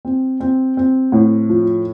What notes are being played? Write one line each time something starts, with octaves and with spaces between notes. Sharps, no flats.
C4
C4
C4
A2
F3